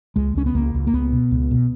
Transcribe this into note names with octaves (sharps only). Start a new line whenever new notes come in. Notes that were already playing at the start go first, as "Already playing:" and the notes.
C#2 G#3
C#2 C#4
B3
C#2 A#3
C#2
A#3
C#2 B3
B2
C#2
B2